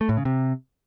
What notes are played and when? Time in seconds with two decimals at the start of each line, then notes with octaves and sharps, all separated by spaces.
0.01 A3
0.09 A2
0.17 C#3
0.25 C3